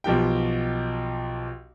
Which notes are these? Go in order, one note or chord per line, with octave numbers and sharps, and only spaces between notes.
B1 F3 G4 G5